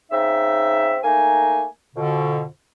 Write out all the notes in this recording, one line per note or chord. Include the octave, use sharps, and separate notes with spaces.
C#3 C4 D#4 E5
A3 A#3 D#4 G#5
F2 B2 D3